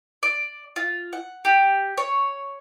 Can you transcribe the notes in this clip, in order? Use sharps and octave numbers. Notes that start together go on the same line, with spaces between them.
D5
F4
F#5
G4
C#5